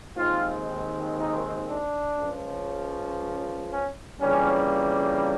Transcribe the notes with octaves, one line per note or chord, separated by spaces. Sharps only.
D#2 D#3 G#3 C4 F4
D#4
D4
C#2 C#3 F3
C#4
F2 C#3 E3 G3 A#3 C#4